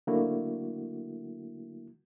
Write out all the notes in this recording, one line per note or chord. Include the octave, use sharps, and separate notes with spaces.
D3 F#3 A3 A#3 E4 F#4